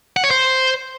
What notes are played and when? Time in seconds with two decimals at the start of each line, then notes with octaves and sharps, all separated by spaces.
0.17 F#5
0.24 C#5
0.31 C5